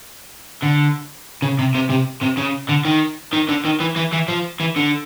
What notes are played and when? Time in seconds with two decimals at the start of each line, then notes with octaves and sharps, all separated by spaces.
0.63 D3
1.42 C#3
1.59 C3
1.75 C3
1.90 C3
2.23 C3
2.38 C#3
2.69 D3
2.85 D#3
3.33 D#3
3.49 D3
3.65 D#3
3.80 E3
3.96 E3
4.12 E3
4.28 F3
4.60 E3
4.76 D3